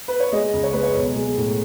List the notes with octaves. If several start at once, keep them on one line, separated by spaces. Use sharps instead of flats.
B4
C#5
G#3 D#5
C#2
C#5
G#3 B4
C#5
B1
G#3
A2